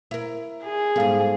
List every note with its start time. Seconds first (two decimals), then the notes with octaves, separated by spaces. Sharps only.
0.11 E4 A#4
0.64 G#4
0.96 G#2 G3 B3 A4 F5